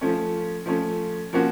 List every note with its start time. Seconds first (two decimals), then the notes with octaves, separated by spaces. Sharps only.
0.01 F3 A3 C#4
0.66 F3 A3 C#4
1.33 F3 A#3 C#4 F#4